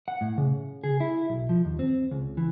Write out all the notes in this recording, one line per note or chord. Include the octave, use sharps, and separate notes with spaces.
F#5
A2
C#3
G#4
E4
B1
F3
D#2
C4
C#2
E3